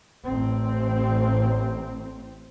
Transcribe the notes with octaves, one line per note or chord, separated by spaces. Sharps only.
A1 C4